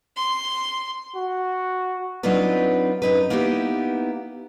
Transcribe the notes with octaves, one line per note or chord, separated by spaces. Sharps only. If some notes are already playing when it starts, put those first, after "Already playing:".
C6
F#4
F#3 C4 D4 D#4 F4 B4
F#2 D#4 B4
A#3 B3 D#4 E4 F#4 G4